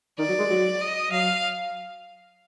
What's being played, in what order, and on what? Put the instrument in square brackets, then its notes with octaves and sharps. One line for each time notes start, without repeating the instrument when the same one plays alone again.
[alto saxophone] D#3 [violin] D5
[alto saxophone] F#3
G#3
F#3
[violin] D#5
[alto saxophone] F#3 [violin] F5